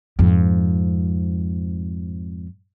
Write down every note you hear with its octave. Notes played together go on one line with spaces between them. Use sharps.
F2 G#2